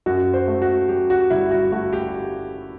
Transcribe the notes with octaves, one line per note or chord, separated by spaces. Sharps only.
F#2 F#4
C5
A3
F#4
F#3 G4
F#4
G1 E4
F#4
A3 F#4
G4